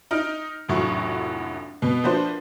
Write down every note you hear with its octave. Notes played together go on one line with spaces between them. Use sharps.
D#4 F6 D7
F1 A#1 A2 F#3 F#4 C#6
B2
F3 A#3 D4 F#4 B4 C5